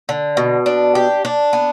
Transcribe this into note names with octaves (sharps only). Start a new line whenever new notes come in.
D3
B2
D4
G4
D4
B3